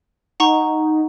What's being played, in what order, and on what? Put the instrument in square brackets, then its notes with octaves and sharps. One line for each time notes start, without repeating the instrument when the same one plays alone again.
[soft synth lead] D#4 [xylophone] F#5 A#5 C#6